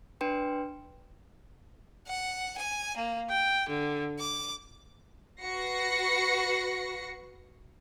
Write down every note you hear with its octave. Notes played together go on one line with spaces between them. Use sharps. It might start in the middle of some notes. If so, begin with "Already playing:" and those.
D4 B4 G5 C6
F#5
G#5
A#3
G5
D3
D6
F#4 B4 A#6 C7 C#7